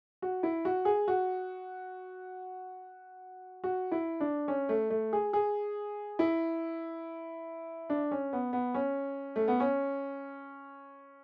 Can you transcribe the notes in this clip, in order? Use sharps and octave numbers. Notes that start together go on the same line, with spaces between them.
F#4
E4
F#4
G#4
F#4
F#4
E4
D4
C#4
A3
A3
G#4
G#4
E4
D4
C#4
B3
B3
C#4
A3
B3
C#4